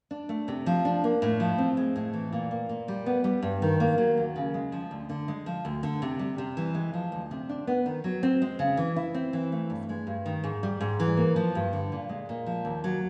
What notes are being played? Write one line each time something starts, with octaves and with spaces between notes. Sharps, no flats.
D4
A3
C3
F3
D4
A#3
A2
F3
C4
G#3
A2
E3
A#2
A#3
A#2
G3
B3
G3
G2
D#3
A#3
F#3
D#2
C#3
G#3
F3
D2
D3
G#3
F3
D2
D3
C3
G3
C3
E3
G#3
F3
D2
C3
D4
B3
D#3
F#3
C4
G#3
C#3
E3
E4
C4
E3
A3
G2
G#3
G2
D#3
G#2
G3
G#2
E3
A#3
F3
G2
D3
A#2
G#3
A#2
F3
D#2
F#3